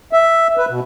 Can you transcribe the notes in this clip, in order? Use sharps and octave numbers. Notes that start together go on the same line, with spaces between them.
E5
B4
B2